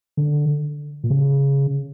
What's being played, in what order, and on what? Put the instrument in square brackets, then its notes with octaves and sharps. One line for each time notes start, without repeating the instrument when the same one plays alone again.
[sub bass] D3
A#2
C#3